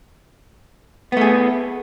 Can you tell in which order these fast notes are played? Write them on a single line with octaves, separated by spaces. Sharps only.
B3 A3 G#4